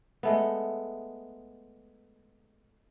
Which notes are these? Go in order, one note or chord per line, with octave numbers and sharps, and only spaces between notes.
G#3 A3 B3